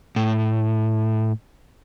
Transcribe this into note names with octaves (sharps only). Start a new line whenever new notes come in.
A2